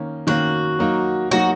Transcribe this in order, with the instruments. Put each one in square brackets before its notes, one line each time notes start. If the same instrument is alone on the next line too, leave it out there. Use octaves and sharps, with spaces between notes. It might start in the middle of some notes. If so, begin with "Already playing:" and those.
Already playing: [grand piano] D#3 A#3 C#4
[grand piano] D#3 A#3 C#4 [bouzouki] F#4
[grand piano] F#3 A#3 D#4
[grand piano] F#3 A#3 D#4 [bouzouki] F#4